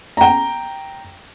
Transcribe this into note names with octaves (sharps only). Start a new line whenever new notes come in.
G5 A#5